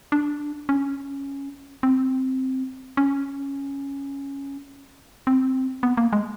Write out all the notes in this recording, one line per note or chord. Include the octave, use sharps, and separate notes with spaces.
D4
C#4
C4
C#4
C4
B3
A#3
G#3